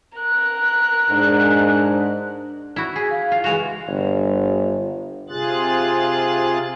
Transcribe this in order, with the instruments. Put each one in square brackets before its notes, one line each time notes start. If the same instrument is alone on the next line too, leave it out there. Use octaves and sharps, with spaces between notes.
[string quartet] A#4 F#6
[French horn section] G#2 D4
[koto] E4 F#4 [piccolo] B5
[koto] G#4 [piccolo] B6
[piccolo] F5
[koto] F4
[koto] E3 G#3 F#4 [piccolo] F7
[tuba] G1
[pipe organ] C3 F4 G#4 F#6 A6